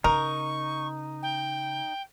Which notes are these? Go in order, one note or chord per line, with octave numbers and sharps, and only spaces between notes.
C#3 D#4 A#4 C#6
G5